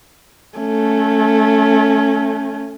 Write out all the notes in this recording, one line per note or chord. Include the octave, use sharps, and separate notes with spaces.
A3 C#4